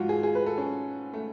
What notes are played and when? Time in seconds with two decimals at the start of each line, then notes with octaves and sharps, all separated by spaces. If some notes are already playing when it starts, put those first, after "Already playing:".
Already playing: G#2 F3 F4 F#4
0.09 G#4
0.23 G#4
0.35 B4
0.46 A4
0.58 C#4
1.13 A3